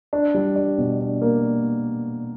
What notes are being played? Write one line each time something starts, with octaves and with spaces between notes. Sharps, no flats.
D4
G3
D4
B2
D4
A#3